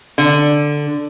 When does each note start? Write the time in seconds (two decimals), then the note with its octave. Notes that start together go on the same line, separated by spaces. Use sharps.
0.18 D3